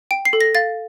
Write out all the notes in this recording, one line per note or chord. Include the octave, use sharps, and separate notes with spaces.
G5 D7
C7
A4
A#6
F5 A6